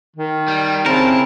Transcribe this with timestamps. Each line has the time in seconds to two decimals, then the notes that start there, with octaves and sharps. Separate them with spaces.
0.16 D#3
0.48 G3
0.86 C#3 C4 E4 A#4 A5